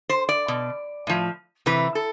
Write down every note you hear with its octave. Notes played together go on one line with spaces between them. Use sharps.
C5
D5
B2
A2 F3
C3 E3 B4
A4